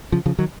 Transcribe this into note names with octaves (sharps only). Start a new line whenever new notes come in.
C#3 F3
C#3 F3
D#3 F#3